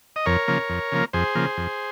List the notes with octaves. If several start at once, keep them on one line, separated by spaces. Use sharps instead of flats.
D#5
F2 A#4 C#5
C#3 F3 A#3
F2
C#3 F3 A#3
F2 G#4 C5
C#3 F3 A#3
F2